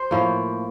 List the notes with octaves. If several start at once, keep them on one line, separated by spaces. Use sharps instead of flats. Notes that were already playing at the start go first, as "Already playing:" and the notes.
Already playing: C5
A2 F3 A#3